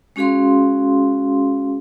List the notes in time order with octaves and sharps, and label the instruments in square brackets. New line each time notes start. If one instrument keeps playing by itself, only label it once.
[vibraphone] G#3 C#4 F#4 G#4 F5 C6